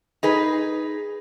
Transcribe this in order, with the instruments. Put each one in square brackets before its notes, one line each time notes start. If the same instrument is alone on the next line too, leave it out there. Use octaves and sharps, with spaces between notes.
[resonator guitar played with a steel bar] D#4 G#4 B4